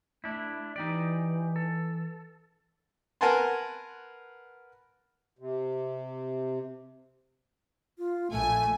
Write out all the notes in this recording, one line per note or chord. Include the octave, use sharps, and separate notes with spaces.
A3 D4 E4
E3 D#4 G4 D5
A4
A#4 B4 F#5 G#5 A5 C6
C3
F4
A#1 A3 G#5